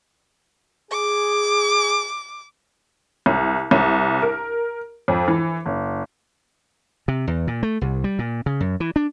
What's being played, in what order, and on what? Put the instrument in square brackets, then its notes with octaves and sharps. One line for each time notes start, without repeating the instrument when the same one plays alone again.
[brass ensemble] G#4 [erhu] D6
[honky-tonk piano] C2
C2
A#4
F2
E3
F#1
[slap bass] C3
E2
A#2
A3
C2
G3
A#2
C#3
F#2
E3
D4